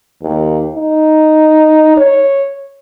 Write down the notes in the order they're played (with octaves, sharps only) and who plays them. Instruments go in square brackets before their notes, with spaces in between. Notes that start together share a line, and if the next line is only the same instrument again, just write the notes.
[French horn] D#2
D#4
C#5